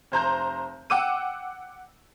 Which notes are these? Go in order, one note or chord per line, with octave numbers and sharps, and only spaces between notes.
F1 C5 A#5 G6
F#5 G5 D6 E6 D#7